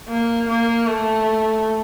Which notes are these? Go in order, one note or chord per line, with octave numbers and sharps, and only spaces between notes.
A#3
A#3
A3